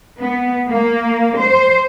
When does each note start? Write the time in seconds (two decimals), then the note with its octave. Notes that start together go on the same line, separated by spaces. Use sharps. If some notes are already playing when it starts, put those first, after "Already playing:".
0.18 B3
0.68 A#3
1.37 C5